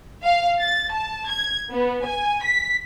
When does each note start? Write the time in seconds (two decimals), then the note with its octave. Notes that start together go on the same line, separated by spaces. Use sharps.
0.23 F5
0.60 A6
0.94 A5
1.31 G#6
1.71 B3
2.04 G#5
2.44 B6